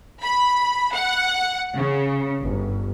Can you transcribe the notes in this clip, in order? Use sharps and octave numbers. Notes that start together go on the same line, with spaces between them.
B5
F#5
C#3
G1